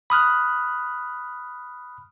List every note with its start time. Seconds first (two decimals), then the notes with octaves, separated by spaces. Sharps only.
0.10 B5 D#6 F6 F#6